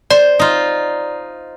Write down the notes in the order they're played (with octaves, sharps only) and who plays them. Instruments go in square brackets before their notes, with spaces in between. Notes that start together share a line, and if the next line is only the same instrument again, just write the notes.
[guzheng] C5 [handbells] D5
[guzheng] D#4 F4